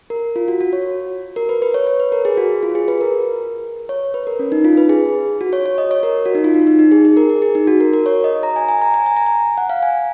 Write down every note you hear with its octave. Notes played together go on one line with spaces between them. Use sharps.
A#4
F4
F#4
F#4
C#5
A#4
B4
B4
C#5
C#5
B4
A#4
G#4
F#4
F4
G#4
B4
A#4
C#5
B4
A#4
C#4
D#4
F4
B4
G#4
F#4
C#5
C#5
D#5
C#5
A#4
F#4
D#4
F4
D#4
D#4
D#4
G#4
G#4
A#4
G#4
G#4
D#4
F#4
A#4
A#4
C#5
D#5
A#5
G#5
G#5
A#5
G#5
G#5
A#5
G#5
F#5
F5
G#5